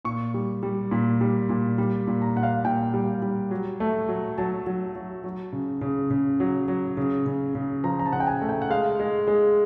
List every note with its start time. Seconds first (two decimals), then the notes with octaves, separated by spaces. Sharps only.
0.05 A#2 C#6
0.34 G3
0.63 G3
0.91 A#2
1.21 G3
1.49 A#2
1.78 G3
2.07 A#2
2.22 A#5
2.36 A#2 F#5
2.43 F5
2.64 A#2 G5
2.94 G3
3.22 G3
3.51 F#3
3.80 A3
4.09 F#3
4.38 F#3 A5
4.67 F#3
4.95 F#3
5.24 F#3
5.52 C#3
5.81 C#3
6.11 C#3
6.40 F#3
6.68 F#3
6.97 C#3
7.26 C#3
7.55 C#3
7.84 F3 A#5
7.99 A#5
8.06 A5
8.13 C#3 F#5
8.20 G5
8.27 G#5
8.42 A3
8.49 G5
8.62 F#5
8.70 G#3 F5
9.00 G#3
9.28 G#3